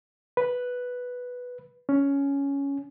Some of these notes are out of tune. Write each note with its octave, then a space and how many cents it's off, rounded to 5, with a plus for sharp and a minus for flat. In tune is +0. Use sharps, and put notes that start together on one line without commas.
B4 +0
C#4 +10